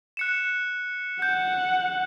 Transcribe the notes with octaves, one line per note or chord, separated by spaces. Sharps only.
F#6 C#7 E7
F#5 G6